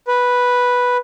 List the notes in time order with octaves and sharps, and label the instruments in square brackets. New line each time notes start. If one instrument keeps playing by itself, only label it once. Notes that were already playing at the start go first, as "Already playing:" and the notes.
[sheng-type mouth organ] B4